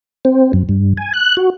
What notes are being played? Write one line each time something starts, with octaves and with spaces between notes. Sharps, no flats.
C4
F#2
G2
G#5
F#6
F#4